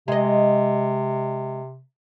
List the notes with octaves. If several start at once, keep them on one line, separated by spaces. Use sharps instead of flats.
C3 G#3 D#5